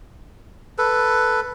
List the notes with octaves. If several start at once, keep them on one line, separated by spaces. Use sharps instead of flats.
A4 B4